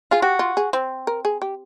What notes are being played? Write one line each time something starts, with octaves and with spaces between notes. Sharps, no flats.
F4 G#4
F#4 G4
F4
G#4
C4
A#4
G#4
G4